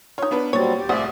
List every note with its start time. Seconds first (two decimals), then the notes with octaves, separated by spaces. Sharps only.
0.18 D#4 F4 C#5
0.31 B3 D4 B4
0.53 A#2 F#3 G3 C4 C#5 A6
0.75 D#2 G4
0.89 C2 A2 F3 G#3 D5 E5 F#5